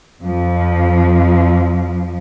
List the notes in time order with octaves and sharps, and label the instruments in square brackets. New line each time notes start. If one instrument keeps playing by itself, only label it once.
[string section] F2 F3